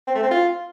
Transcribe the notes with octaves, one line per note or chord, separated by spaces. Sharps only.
C4
A3
C4
F4